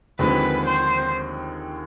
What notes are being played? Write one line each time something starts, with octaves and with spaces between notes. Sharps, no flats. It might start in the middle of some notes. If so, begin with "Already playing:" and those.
D#2 D3 F3 G#3 C4 B4
C5